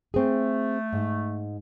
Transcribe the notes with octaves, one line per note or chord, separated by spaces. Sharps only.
A3 C4 G#4
G#2